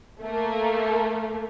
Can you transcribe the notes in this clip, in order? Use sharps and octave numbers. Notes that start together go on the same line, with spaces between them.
A3 A#3